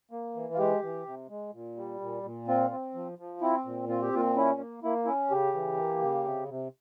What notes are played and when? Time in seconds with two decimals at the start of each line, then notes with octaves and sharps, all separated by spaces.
0.11 A#3
0.35 E3
0.54 F4
0.58 G#3 G4
0.82 E3
1.06 C3
1.29 G#3
1.53 A#2
1.77 G3
2.00 A#2
2.23 A#2
2.48 C4 F4
2.71 C4
2.94 F3
3.19 F3
3.41 C4 E4
3.65 A#2
3.88 C4 F4
4.02 G4
4.13 A#2 F4
4.37 C#4 E4
4.60 A#3
4.83 A#3 E4
5.05 C#4 E4
5.31 C#3 G4
5.54 E3
5.78 A#3
6.01 C#3
6.25 C3
6.49 C3